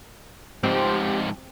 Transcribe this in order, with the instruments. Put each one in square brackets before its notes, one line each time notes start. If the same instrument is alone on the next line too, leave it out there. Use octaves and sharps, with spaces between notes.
[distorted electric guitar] G#2 F3 [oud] C4 [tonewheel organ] G4